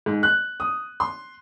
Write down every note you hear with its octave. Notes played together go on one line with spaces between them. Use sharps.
G#2
F#6
D#6
C6